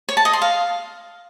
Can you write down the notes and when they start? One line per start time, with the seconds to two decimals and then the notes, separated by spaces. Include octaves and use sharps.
0.09 C#5
0.17 A5
0.25 D#5
0.33 C6
0.42 F5